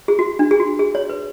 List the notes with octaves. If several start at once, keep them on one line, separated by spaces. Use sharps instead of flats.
G#4
F#4
D4
G#4
F#4
G#4
C#5
B4